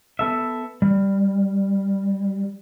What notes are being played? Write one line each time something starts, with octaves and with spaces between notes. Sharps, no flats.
B3 A4 E5
G3